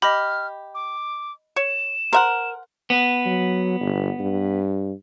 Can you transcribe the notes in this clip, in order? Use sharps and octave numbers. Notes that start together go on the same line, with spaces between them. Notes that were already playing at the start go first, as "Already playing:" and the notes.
G4 D#5 B5 F6
D6
C#5 E7
A#4 C5 E5 F#5
B3
F#3
G1
G2